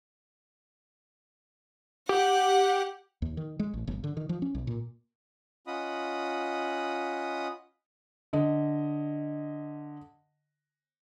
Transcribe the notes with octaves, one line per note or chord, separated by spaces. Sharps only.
G4 F#5
D#2
D#3
G#3
A1
G1
D3
D#3
F3
C#4
B1
A#2
C#4 F4 D#5 F#5 B5 D#6
D3 D#5